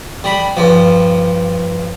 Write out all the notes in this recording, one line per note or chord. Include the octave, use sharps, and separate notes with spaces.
G3 B5
G2 F3